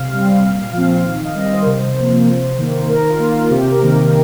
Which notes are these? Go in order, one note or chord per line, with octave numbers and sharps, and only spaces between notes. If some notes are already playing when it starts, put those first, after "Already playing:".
Already playing: C3 F5
G3 C4
A#2
F3 C4
D#3 F5
D#5
G3 C4
D#5
C5
A#4
C3 C5
F3 A#3
C3
D#3 A#3
D#3 A#4
F4
A#3
F4
C3 G4
A#4
D#3 A#3